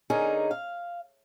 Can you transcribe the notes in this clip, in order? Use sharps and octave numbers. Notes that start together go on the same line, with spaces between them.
D3 C#4 D#4 G#4 A#4
F5